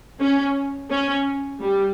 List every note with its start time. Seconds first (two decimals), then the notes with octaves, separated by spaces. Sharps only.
0.20 C#4
0.90 C#4
1.61 G3